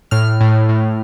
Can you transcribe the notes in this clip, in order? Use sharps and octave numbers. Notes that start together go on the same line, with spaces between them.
A2 F6
A2
A2